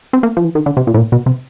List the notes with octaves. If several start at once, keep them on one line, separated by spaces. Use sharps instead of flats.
C4
A#3
F3
E3
D#3
D3
C3
A#2
A2
A#2
B2
C3